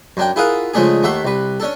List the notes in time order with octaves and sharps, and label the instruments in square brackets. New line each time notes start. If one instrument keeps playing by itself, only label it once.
[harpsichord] F#2 D4 G5
E4 F4 G#4 A#4 F5 F#5
C#3 F3 G#3 A3 D4 G#4
D#2 A3 E5 F#5 C6
C2 B4
C#4 D4 A4